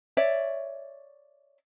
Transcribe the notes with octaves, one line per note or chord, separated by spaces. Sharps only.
C#5 D5 E5